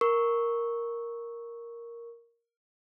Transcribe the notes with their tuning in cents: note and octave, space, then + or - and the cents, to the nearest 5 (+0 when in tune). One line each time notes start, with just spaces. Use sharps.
A#4 +0 C#6 +0